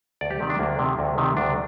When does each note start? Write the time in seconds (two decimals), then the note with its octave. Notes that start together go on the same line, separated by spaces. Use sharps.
0.21 D2 D5
0.31 G4
0.40 C3 D#3
0.50 D4
0.59 D2 A#3
0.79 C3 D#3
0.99 D2
1.18 C3 D#3
1.37 D2 D4